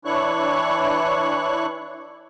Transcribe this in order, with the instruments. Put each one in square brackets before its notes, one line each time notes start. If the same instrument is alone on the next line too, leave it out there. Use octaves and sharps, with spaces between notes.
[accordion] E3 D4 E4 C#5 C#6 F#6